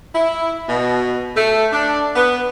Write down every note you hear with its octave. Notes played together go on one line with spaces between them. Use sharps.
E4
B2
A3
D4
B3